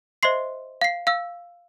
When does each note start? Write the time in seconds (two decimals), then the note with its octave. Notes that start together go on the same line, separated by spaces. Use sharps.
0.23 C5 D#5 E5 C6 C7
0.81 F5 C7
1.07 F5 E6